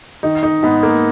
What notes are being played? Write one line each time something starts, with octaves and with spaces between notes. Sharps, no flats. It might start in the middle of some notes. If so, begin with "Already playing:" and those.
D#3 D#4
D#4
G#2 B3
A#3